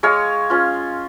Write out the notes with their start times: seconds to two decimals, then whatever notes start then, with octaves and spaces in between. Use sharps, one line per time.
0.03 G#3 C#5 F5
0.50 C#4 F4